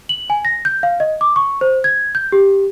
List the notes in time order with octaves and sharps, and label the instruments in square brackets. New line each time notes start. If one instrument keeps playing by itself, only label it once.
[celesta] F#7
G#5
A#6
G6
F5
D#5
D6
C#6
C5
G#6
G6
G4